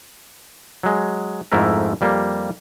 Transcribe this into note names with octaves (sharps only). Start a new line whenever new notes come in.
F#3 G#3
F2 G#2 A3 E4 A#4
F2 G3 A#3